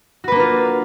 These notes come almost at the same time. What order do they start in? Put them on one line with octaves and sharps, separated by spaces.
F#4 B4 A#3 D4 F4